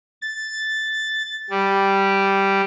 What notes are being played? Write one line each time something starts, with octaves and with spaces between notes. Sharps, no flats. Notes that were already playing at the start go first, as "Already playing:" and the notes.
A6
G3